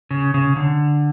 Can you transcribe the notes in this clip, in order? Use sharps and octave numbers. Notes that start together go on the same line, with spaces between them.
C#3
C#3
D3